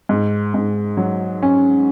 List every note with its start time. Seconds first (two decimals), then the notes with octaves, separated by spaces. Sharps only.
0.09 G#2
0.54 G#2
0.97 F#3
1.42 C#4